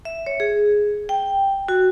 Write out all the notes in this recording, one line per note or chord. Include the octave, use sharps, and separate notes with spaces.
E5
C#5
G#4
G5
F#4